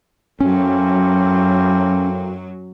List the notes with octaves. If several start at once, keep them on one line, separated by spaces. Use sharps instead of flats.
F#2 A2 F#3 A#3 C4 C#4